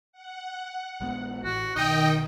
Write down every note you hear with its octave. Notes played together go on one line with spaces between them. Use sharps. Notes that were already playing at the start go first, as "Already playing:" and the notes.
F#5
A#1 G#3 B3
A1 F#4
B1 D#3 D#4 D#5 G5